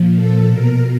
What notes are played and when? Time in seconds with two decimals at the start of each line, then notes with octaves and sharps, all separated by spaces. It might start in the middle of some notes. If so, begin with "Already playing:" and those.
Already playing: A#2 F3
0.15 A4
0.49 B2 A#4